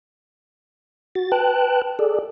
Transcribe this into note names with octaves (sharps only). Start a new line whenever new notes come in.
F#4 A6
B4 G5 A5 F#6
G#4 A4 D5